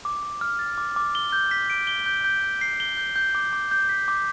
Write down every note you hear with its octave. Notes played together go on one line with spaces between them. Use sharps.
D6
D6
F6
A6
D6
D6
G7
G6
B6
D7
G7
G6
G6
G6
C7
G7
G6
G6
D6
D6
G6
B6
D6